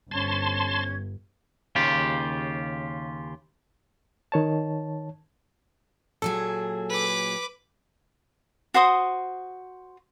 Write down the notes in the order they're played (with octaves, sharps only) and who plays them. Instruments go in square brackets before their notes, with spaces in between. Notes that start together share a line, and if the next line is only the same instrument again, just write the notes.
[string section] G1 [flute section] C#4 C5 G#6 [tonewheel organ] A5 C6
[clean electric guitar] D#2 C#3 F4 G4
[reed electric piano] D#3 C#5 A5
[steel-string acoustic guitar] A#2 F#3 G#4 [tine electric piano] A4
[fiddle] B4 D6
[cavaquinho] F#4 C5 C6 D#6